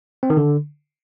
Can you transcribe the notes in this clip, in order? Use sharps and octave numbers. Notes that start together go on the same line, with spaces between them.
C4
D#3
D3